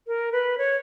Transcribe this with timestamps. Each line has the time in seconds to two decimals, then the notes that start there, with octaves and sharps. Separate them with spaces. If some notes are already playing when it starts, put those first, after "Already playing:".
0.07 A#4
0.32 B4
0.58 C#5